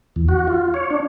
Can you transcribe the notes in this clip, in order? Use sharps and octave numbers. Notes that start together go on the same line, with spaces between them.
E2
F#4
F4
C#5
D4